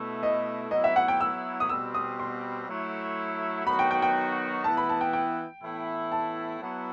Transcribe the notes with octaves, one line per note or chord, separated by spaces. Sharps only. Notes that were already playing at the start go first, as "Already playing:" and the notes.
Already playing: B2 A3 E4
D#5
F#3 B3 E4 D#5
E5
F#5
G5
E6
D#6
B2 G3 C4 E6
D#6
C6
F#3 A3 E4
D#3 F#3 B3 D#4 F#4 B5
G5
G5
G5
E3 B3 E4 A5
B5
A5
G5
G5
A2 E3 B3 E4
A5
F#3 B3 E4